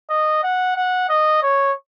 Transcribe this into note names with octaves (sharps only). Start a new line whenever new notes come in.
D#5
F#5
F#5
D#5
C#5